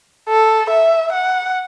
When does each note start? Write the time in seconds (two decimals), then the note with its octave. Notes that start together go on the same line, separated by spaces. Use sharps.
0.29 A4
0.70 E5
1.13 F#5